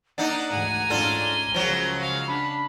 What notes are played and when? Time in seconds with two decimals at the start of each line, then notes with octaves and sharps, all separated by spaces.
0.18 A#3 D4 D#4 D#5 F#5
0.50 D2 G#2 E3 G#5 A#5
0.90 G#2 G#3 C#4 D4 F4 A4 G7
1.54 C#2 C#3 F3 F#3 G#3 A#4
1.97 F#4 F5
2.27 D4 B5